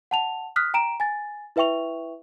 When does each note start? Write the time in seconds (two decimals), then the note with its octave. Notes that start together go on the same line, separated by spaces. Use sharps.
0.11 F#5 A5 F7
0.56 D#6 F6 F#6 B6
0.74 G5 A#5 D7 E7
1.00 G#5 A6
1.56 E4 B4 E5 G5 C#6 F7